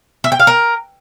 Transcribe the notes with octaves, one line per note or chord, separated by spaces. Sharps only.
E5
G5
F5
A#4